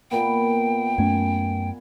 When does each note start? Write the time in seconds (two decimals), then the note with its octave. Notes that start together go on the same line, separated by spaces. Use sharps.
0.11 A#2 B3 G5
0.98 F#2 A3 C#4 G#5